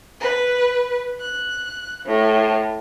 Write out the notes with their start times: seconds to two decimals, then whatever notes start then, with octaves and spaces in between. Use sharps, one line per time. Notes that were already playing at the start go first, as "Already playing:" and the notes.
0.19 B4
1.21 F#6
2.06 A2